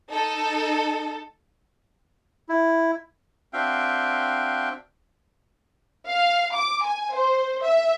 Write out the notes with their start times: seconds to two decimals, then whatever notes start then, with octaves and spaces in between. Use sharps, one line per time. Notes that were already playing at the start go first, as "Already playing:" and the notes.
0.10 D#4 A4
2.49 E4
3.53 C4 D4 F#4 E5 F5 G5
6.08 F5
6.54 D6
6.83 G#5
7.13 C5
7.63 E5